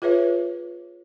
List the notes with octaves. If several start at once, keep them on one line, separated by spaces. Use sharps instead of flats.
F4 G#4 B4 C#5 E5